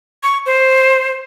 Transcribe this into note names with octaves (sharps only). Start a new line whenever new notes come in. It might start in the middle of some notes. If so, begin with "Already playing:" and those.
C#6
C5